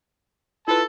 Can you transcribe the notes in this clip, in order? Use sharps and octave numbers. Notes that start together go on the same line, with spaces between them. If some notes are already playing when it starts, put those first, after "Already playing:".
E4 F4 A4 B4 A5